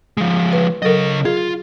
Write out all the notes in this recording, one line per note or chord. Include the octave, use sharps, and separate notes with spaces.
F3 G#3
B4
C#3 F#3 A4 A#4 D#5
F4 G#4